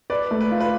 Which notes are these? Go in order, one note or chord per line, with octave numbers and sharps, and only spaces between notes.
B4 D5
A3
B4
F4
B4